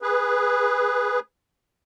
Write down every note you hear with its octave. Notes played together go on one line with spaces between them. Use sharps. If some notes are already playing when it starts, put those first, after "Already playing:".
G#4 B4